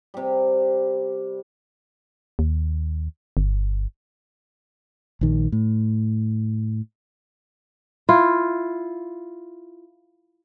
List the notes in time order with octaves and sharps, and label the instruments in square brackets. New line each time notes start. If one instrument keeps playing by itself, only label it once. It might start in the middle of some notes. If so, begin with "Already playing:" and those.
[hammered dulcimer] C3 G3
[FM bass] D#2
G1
[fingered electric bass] A#1 D#3
A2
[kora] E4 F4